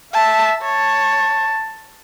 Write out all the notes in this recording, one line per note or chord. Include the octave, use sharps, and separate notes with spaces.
E5 A5
C#5 A5